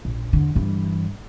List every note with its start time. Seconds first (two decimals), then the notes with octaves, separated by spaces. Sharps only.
0.05 A#1
0.33 E2 D3
0.55 G2 E3